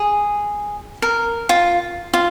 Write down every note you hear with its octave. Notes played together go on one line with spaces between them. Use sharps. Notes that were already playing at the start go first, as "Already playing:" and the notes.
Already playing: G#4
A#4
F4
F4